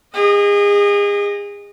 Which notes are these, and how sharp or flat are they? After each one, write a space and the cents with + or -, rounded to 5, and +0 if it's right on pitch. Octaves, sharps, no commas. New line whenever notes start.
G#4 -35 D#5 +0